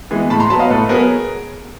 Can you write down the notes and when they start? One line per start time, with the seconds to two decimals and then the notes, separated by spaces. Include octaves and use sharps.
0.11 E3 G#3 B3
0.30 A2 A5 B5
0.40 A#5 C6
0.50 F#3 B3 A5 B5
0.59 D#5 F5
0.69 A2 A4 B4
0.89 F#3 B3 G#4 A#4